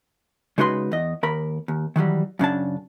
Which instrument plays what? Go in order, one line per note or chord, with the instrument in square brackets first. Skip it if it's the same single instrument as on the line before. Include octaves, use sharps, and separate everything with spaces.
[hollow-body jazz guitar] C#3 G#3 D#4 F#4 B4 C6
E2 D#5
D#2 A#4 B5
D#2
D#3 E3 F#3 G3
F#2 C#3 D4 A5